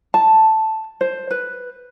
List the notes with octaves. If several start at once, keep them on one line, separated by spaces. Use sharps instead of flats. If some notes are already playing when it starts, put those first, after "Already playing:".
A5
C5
B4